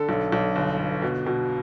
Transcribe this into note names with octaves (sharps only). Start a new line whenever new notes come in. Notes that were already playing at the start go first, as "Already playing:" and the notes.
Already playing: D3 A4
B1
B1
G1
G1
B2
B2